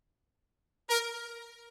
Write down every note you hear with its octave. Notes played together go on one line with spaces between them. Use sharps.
A#4